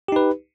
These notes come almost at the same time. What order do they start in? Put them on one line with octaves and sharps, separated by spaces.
G4 D#4 B4